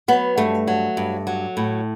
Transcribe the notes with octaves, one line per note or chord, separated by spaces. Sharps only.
F#3 B3
G2 A3
F#3
G2
F#3
A2